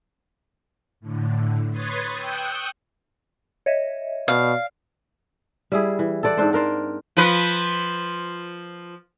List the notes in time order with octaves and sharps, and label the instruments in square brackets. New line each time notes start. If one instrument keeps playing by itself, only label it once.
[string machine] A2 D3
B4 C#5 C6 D#6 G#6 A6
G5 C#6 D#6 E6 F#6 G6
[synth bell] C#5 D#5 E5
[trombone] B2 [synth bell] D5 [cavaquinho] F5
[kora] G3 E4 G#4
E3
A4 C5 D5 F#5
G#2 C4 D4 C5
D4 A#4 C5 D5
[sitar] F3 B4